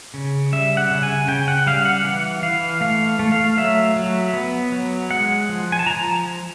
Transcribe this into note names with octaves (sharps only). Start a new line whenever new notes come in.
C#3
G3 E5
F#5
C#3
G#5
C#3 G5
F#5
G3 F5
F#5
E3 F#5
E3 F5
A3 F5
A3
F5
F#3 E5
F#3
B3
F#3
G#3 F#5
F3
G#5
A5
F3 A#5